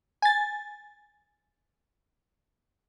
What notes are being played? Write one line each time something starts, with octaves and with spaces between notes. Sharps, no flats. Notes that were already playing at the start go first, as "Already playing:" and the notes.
G#5 A6